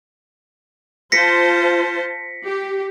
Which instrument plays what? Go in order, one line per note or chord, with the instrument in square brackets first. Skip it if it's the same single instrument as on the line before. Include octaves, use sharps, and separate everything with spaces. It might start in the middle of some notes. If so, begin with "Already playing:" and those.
[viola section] F4 C5 A5 [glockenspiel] A#6 B6 C#7
[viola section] G4